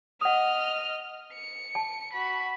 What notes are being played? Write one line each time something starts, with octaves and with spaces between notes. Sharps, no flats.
D#5 F#5 D#6 F6
C#7
A5
F#4 B5